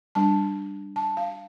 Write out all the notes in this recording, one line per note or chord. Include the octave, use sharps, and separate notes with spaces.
G3 D4 A5
A5
F5